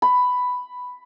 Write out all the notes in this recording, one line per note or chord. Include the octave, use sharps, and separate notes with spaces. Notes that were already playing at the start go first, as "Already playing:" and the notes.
B5